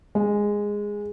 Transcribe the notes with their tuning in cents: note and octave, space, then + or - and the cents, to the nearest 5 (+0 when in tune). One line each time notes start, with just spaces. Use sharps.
G#3 -10